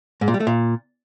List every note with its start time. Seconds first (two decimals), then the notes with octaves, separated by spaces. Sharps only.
0.21 G#2
0.28 A#2
0.34 G3
0.40 A3
0.47 A#2